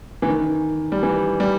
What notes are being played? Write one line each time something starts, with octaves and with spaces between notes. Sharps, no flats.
E3
D#3
G3
E3
G3